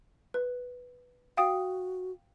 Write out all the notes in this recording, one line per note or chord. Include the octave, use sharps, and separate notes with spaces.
B4
F#4 F5 G5 D#6